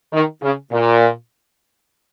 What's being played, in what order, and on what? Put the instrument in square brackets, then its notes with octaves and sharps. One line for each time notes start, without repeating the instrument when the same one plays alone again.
[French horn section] D#3
C#3
A#2